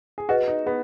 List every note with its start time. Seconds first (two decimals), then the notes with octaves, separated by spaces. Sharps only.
0.18 G#4
0.29 F#4 G#4 B4 D#5
0.48 D#4
0.66 B3 G#4